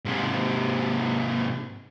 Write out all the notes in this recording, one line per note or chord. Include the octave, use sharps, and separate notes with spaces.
G#2 C3